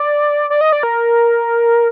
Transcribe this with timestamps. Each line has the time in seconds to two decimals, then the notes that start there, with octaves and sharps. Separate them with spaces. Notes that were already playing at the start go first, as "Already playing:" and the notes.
Already playing: D5
0.50 D5
0.61 D#5
0.72 D5
0.83 A#4